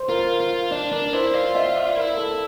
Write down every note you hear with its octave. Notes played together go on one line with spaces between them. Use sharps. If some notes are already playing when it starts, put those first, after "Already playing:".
Already playing: C5
F4 A#4
F4
D4 D5
D4 A#4
E4 C5
F4 D5
E5
D5
E4 A#4
A4